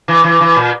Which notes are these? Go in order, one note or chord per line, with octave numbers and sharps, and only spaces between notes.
E3
E3
E3
A#2